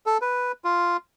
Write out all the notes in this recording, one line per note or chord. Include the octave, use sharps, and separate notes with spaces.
A4
B4
F4